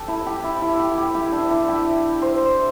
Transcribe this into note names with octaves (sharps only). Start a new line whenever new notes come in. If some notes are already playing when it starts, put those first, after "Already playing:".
Already playing: G4 A4
E4
G4
E4
E4
G4
G4
E4
D4
E4
G4
C5